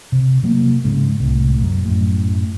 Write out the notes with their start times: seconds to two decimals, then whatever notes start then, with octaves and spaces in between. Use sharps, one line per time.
0.12 C3
0.43 C3 F#3 A#3
0.85 G#2 C#3 G#3
1.20 C2 A2
1.58 A#1 F#2
1.84 F#2 A2